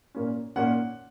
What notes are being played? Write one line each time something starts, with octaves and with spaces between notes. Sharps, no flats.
A#2 A#3 C#4
A#2 A#3 C#4 F#5